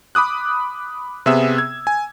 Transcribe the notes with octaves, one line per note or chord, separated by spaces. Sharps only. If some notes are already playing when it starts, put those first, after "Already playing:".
B5 D6 D#6 F#6
C3 B3 G#4 E5 E6
G#6
G#5